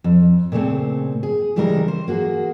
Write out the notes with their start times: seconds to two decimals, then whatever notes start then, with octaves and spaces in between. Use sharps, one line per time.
0.04 F2
0.52 A#2 C#3 A3 C4
1.23 G#4
1.56 C#3 E3 G3 G#3 C#4 A#4
1.88 C5
2.08 A#3 F#4 G#4